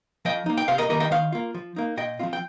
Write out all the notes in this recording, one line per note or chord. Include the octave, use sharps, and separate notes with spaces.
F3 D#5 G5
A#3 D#4
G5
C3 C5 F5
A#4 D#5
D#3 G3 A#3 A#4 D#5
D#5 G5
D#3 C5 F5
A#3 F4
F3
A#3 D#4
A#2 D#5 G5
F3 C4 F4
G5